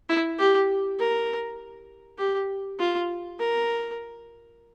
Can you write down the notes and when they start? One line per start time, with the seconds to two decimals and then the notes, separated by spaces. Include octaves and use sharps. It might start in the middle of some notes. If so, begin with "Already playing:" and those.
0.09 E4
0.39 G4
1.00 A#4
2.19 G4
2.80 F4
3.39 A#4